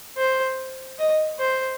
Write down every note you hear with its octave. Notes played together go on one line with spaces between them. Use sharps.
C5
D#5
C5